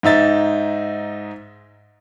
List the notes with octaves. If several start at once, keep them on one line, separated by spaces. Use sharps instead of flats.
G#2 D#4 E5 A6